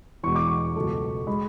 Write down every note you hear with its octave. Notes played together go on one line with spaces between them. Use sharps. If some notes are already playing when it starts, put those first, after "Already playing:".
E2 B2 G#3 C#6
D6
C#6
C#2 B2 F#3 A3
G#3 B5